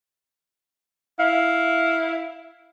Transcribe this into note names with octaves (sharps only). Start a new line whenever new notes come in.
E4 F5